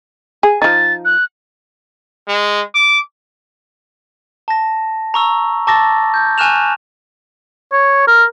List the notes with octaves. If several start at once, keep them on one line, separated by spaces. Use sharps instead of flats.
G#4
F3 D#4 A6
F#6
G#3
D6
A5 A#6
A#5 C#6 E6
A5 C#6 D6 E6 A6 A#6
G6
G#5 C#6 F6 F#6 E7 F7
C#5
A#4